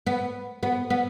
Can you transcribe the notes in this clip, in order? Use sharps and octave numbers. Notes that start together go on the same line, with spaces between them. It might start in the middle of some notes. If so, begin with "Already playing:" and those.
B3
B3
B3